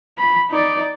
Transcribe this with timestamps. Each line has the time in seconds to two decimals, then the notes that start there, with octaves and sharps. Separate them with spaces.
0.18 B5
0.50 D#4 D5